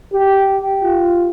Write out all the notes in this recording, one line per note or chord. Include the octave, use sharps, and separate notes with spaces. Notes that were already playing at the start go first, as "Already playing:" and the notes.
G4
F4